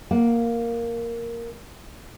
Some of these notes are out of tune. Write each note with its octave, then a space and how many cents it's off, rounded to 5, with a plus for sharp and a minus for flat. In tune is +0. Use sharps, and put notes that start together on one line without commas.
A#3 +0 F#5 -10